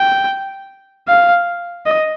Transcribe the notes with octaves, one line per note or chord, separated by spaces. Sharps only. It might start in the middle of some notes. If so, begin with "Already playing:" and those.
Already playing: G5
F5
D#5